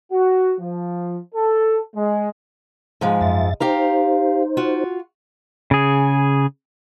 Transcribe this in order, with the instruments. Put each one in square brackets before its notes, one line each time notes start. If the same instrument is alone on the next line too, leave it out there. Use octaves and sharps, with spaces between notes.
[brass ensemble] F#4
F3
A4
G#3
[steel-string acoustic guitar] G#2 F3 G#3 [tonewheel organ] G#5
[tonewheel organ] F#2 E5 A6
[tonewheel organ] D#4 C5 [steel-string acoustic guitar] G4 F5 A#5
[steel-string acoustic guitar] F4 F#4
[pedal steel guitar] C#3 G#4